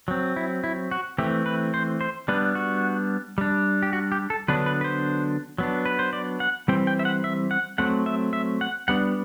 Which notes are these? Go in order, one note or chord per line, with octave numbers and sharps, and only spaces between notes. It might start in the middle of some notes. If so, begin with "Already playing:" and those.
F#3 C4
E4
E4
F#4
E3 A3 C4 G4
B4
C5
C5
G3 B3 D4 B4
F#4
G3 D4
G4
F#4
G4
A4
D3 F#3 B3 D4 B4
B4
B4
C5
F#3 B3 D4
B4
C5
D5
F#5
E3 G3 C4 G5
G5
E5
F#5
E5
F#5
F#3 A3 C4 F#5
E5
E5
F#5
G3 B3 D4 F#5